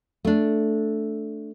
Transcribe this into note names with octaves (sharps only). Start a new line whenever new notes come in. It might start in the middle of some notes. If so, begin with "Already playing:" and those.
A3 D4